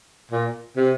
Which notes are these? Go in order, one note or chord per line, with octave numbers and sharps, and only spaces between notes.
A#2
C3